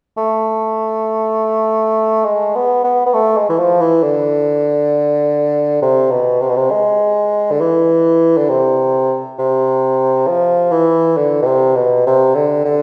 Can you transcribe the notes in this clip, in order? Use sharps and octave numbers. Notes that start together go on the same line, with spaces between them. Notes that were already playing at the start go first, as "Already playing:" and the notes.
A3
G#3
B3
B3
B3
A3
G#3
E3
F3
E3
D3
C3
B2
C3
B2
C3
G#3
D3
E3
D3
C3
C3
F3
E3
D3
B2
C3
B2
C3
D3
D3